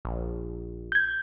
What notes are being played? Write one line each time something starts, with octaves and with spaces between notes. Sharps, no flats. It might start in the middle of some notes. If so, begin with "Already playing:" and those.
A#1
G6 G#6